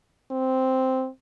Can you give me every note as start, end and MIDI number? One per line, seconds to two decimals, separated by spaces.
0.31 1.08 60